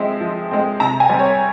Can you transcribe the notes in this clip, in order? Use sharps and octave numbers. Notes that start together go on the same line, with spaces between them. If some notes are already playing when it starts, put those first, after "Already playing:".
Already playing: F3 G#3 C4 E5
F3
G#3 C4
C3 A#5
G#5
G3 C4
C#5